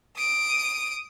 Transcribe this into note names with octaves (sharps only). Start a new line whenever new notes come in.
D#6 D7